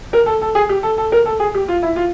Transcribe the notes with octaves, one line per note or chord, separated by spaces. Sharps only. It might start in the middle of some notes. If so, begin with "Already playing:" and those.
A#4
A4
A4
G#4
G4
A4
A4
A#4
A4
G#4
G4
F4
E4
F4